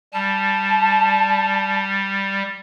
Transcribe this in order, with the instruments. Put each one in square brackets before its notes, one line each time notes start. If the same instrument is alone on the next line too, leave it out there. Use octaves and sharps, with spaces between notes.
[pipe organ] G3 [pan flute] A5